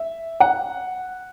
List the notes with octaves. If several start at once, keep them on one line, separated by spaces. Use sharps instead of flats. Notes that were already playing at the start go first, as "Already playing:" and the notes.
Already playing: E5
F#5